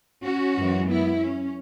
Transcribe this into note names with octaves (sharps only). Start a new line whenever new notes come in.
C#4 F#4
F#2 E3 G#3
B3 E4
C#4